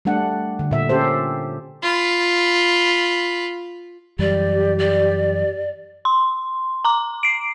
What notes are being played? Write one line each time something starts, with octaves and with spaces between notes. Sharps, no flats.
G3 A3 D4 F#5
D3
A#2 E5
C#4 G4 A4 C5
F4 B5
F#2 E3 G3 G4 D5
D5
C6
A#5 D6
C7 D7